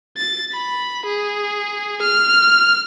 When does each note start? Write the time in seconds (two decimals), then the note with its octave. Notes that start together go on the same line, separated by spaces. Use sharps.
0.17 A6
0.53 B5
1.05 G#4
2.02 F6